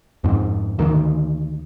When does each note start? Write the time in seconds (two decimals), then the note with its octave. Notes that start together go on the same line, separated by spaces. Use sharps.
0.24 F2 G#2
0.79 D2 D#3